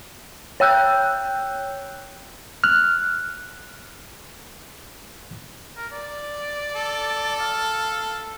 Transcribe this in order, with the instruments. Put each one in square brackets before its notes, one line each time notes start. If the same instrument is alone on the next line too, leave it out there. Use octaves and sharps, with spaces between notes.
[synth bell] C#5 G5 E6 F#6 G6
[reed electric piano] F6 F#6
[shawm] A#4
D5
[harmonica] A4
[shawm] F5